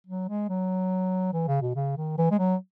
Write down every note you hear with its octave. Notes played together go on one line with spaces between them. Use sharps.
F#3
G#3
F#3
E3
C#3
B2
C#3
D#3
E3
G#3
F#3